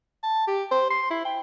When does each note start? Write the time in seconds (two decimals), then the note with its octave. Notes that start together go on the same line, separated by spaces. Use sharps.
0.23 A5
0.47 G4
0.71 C5
0.90 C6
1.10 E4
1.25 G5